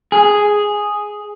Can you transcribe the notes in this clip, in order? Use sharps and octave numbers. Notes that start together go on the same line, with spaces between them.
G#4